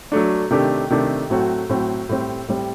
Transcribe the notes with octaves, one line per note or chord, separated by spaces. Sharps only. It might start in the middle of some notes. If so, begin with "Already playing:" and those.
F#3 A3 D4
C3 D#3 A3 D4 G4
C3 D#3 A3 D4 G4
A2 F#3 A3 C4 F#4
A2 F#3 A3 C4 F#4
A2 G3 C4
A2 G3 C4